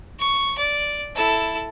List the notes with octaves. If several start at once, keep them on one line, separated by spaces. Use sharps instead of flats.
C#6
D5
E4 A4